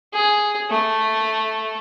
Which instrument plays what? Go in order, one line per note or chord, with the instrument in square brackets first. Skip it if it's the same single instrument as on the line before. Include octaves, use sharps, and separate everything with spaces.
[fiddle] G#4
A3